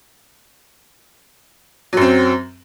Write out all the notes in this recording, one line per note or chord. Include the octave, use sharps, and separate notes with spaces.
F#2 F#3 C4